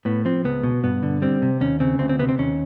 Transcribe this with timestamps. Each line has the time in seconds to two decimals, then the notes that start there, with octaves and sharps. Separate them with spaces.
0.05 A2 B3
0.25 F3 C4
0.45 C#2 B3
0.63 B2
0.84 G2 B3
1.03 D3
1.22 G3 C4
1.42 C3
1.61 D#2 C#4
1.80 C#3 C4
1.99 D2 C4
2.09 C4
2.19 C3 B3
2.29 C4
2.39 D#2 C#4